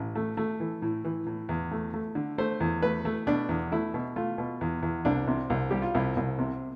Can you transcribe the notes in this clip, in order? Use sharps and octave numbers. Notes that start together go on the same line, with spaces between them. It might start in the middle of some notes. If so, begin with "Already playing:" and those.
Already playing: A1
A3
A3
E3
A2
E3
A2
E2
A3
A3
D3
A3 C5
E2
A3 B4
A3
B2 D4
E2
A3 E4
B2
A3 F4
B2
E2
E2
C2 D4
C3
C2
G3 G4
F4
C2 E4
C2
C3